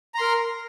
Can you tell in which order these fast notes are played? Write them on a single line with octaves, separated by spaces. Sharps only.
A#5 C6 A#4